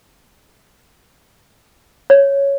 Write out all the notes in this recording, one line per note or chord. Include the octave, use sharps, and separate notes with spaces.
C#5